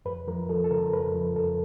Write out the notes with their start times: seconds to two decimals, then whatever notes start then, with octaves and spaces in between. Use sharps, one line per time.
0.05 F2 B4
0.28 F3 A#4
0.49 F3 A4
0.64 A4
0.71 C#3 A#4
0.93 F2 B4
1.14 F3
1.36 F2 A4